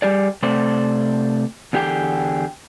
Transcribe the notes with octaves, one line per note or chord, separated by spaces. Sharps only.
G3 G4 G#4 D5
C3 A3 C5 D5
E2 D3 G4 G#4 G5